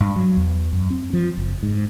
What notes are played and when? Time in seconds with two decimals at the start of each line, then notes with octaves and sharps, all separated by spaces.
0.01 G2
0.16 F#3
0.37 E2
0.73 F#2
0.90 C4
1.13 F3
1.37 F#1
1.63 G#2